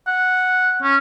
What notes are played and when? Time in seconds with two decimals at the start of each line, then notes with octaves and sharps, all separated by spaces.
0.07 F#5
0.82 C#4